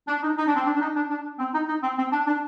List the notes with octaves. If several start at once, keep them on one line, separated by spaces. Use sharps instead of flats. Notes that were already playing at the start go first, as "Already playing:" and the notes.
D4
D#4
D#4
D4
C4
D4
D4
D#4
D4
D4
C4
D#4
D#4
C4
C4
D4
D4